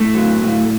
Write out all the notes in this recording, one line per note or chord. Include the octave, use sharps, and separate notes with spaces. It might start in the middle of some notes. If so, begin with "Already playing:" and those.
Already playing: A2 A3 A4
F#3
A2